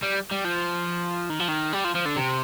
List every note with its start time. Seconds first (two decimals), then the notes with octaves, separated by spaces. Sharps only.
0.03 G3
0.32 G3
0.45 F3
1.30 D#3
1.39 F3
1.48 D#3
1.73 G3
1.84 F3
1.95 F3
2.05 D3
2.16 C3